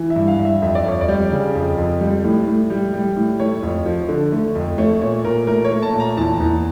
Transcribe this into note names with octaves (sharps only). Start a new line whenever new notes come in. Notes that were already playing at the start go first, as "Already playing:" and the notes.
Already playing: E3
E5
G2
F5
G2
E5
F2 E5
D5
F2 C#5
D5
G3
C#3
F2
F2
G3
A2
A2
G3
G3
A2
A3 C#5
F2
F3
D3
A3
F2
A3 C#5
A#2 C#5
A#2 A#4
A3 A#4
C#5
A3
A5
A#2
A#5
E2 A5
E2